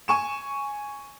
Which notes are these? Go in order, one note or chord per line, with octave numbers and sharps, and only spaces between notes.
G#5 C#6 E7